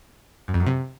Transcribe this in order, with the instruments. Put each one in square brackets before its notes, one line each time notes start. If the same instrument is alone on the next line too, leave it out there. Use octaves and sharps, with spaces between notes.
[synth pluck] F#2
F2
F#2
C3